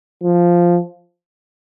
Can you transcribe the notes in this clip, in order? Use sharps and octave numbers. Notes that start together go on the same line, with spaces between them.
F3